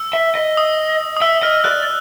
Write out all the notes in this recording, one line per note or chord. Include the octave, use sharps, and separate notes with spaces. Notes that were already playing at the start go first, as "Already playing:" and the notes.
Already playing: E6
E5
D#5
D#6
D#6
E5 E6
D#5 F6
D5 F#6